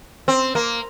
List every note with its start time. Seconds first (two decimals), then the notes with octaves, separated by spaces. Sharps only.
0.28 C4
0.55 A#3